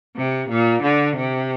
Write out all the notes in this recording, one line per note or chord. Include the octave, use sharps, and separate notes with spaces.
C3
A#2
D3
C3